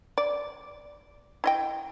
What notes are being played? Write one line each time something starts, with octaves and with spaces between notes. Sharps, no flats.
D5
E4 D#5 G5